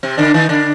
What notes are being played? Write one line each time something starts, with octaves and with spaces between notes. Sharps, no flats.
C3 C4
D3 D4
D#3 D#4
D3 D4